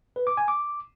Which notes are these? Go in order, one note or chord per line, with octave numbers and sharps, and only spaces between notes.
B4
D6
G#5
D6